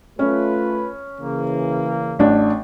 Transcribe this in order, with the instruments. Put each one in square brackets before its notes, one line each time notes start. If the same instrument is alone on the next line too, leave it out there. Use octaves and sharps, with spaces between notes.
[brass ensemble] A3 F4 B4 [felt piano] C#4
[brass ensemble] C#3 E3 A#3
[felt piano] A1 D4